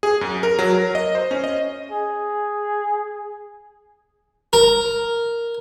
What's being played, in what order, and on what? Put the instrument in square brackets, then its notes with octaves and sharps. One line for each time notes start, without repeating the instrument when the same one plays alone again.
[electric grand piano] G#4
F#2
A#4
F#3
A#4
D#5
C5
C#4
D#5
[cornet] G#4
[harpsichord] A#4